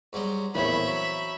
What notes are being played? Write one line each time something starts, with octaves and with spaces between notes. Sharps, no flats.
G#2 F#3 G3
A#1 E2 A2 E3 C4 C#5 E5 B5
F#3